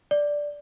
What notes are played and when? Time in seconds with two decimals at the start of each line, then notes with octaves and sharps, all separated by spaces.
0.11 D5